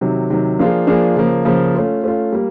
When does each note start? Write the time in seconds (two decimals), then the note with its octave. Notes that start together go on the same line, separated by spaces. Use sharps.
0.01 C3 D#3 F#3
0.30 C3 D#3 F#3
0.59 F3 A#3 D4 F4 G#4
0.87 F3 A#3 D4 F4 G#4
1.16 C#3 F3 A#3
1.45 C#3 F3 A#3
1.74 A3 C#4 F4
2.04 A3 C#4 F4
2.32 G3 A#3